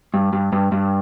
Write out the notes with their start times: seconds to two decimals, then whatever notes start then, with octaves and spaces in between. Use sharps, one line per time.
0.14 G2
0.33 G2
0.52 G2
0.72 G2